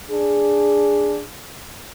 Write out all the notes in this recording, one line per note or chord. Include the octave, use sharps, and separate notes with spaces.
D4 G#4